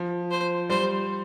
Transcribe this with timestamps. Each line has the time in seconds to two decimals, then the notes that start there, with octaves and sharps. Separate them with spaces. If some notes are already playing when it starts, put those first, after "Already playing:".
Already playing: F3
0.31 C5
0.69 G3 C5